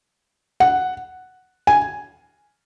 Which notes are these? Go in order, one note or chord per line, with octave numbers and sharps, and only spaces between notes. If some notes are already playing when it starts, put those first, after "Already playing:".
F#5
G#5